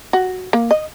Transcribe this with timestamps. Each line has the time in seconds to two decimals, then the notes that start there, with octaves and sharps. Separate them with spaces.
0.13 F#4
0.53 A#3
0.71 D#5